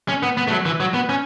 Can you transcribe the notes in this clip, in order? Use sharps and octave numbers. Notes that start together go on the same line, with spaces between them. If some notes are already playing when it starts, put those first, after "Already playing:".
C#4
B3
B3
A3
F#3
E3
F#3
B3
C#4